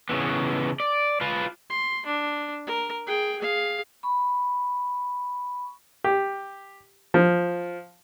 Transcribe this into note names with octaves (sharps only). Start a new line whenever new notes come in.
C#3 E3 B3
D5
F4 B4
C6
D4
A#4
G#4 G5
G#4 F5
B5 C#6
G4
F3